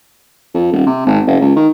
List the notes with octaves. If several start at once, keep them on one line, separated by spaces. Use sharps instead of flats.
F2
D#1
C3
G#1
F#1
C#2
D#3